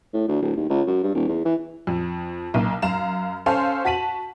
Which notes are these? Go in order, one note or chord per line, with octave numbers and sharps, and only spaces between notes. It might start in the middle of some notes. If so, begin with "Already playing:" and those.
A2
D2
D1
D#2
C#2
F#2
G2
D#1
E2
E3
F2
B1 A#3
F#2 F5 A#5 E7
C#4 A4 C5 F5 G#5 C6
F#4 A5 B6 D#7 F#7